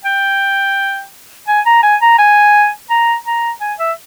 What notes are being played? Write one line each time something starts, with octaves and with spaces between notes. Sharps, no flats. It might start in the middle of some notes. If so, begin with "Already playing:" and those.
G5
G#5
A#5
G#5
A#5
G#5
A#5
A#5
G#5
E5